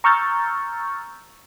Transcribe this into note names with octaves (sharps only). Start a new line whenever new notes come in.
A#5 C#6 E6 F6 G6 A6